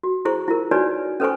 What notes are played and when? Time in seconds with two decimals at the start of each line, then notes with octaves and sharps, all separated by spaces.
0.03 F#4
0.25 E4 G#4 C5 C#6
0.48 E4 F4 A#4
0.71 D#4 F#4 B4 C#5 D5 G#5
1.20 C#4 A4 B4 C5 G#5 C#6